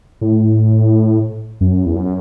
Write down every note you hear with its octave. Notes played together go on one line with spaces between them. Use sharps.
A2
F#2
E2
F#2